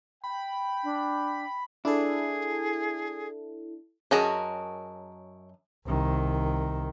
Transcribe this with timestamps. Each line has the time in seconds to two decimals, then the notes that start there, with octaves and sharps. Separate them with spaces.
0.24 G5 B5
0.84 D4
1.85 D4 E4 G#4 A4
4.11 F#2 C#4 F#4 G#4 A#4 D#5 A5
5.87 C2 D#3